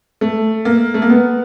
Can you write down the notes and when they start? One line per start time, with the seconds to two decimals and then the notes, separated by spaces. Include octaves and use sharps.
0.21 A3
0.65 A#3
0.94 A3
1.02 A#3
1.09 B3